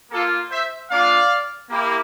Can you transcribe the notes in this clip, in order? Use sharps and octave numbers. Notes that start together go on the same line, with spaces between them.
A#3 F4 A4
C5 E5
A#3 D4 F4 D5 F5
A#3 E4 G4